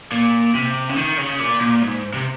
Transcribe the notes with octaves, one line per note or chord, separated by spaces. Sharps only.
A#2
C3
C#3
D#3
C#3
A#2
A#2
G#2
C3